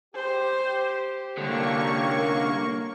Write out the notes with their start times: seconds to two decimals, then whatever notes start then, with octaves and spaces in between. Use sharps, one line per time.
0.15 G4 C5
1.37 C2 D3 A#3 C#5 C#6